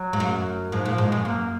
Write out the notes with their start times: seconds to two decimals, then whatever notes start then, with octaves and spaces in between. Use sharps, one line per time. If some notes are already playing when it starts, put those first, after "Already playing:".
Already playing: F#3
0.13 G#2
0.20 F#2
0.72 G#2 F3
0.85 A#2 F3
0.98 G#2
1.08 F#2 G#3
1.25 F#2 A#3